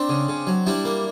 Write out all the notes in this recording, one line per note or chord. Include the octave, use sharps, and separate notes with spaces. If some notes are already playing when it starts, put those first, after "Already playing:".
Already playing: C4 D4
C#3
C#3
F#3
G3 D4 E4
A#3